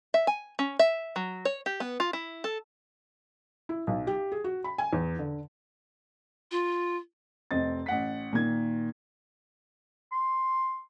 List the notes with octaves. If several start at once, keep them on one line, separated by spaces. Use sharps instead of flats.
E5
G#5
C#4
E5
F#3
C#5
G4
B3
F4
E4
A4
E4
B1
G4
G#4
F#4
B5
G#5
E2
D3
F4
F1 C4 D#5 A6
A1 F#5 B6
A#2 D#3 G#6
C6